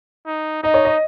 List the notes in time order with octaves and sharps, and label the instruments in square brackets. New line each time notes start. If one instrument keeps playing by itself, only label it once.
[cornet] D#4
[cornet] D#4 [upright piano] D#5
[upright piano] C#5
D#5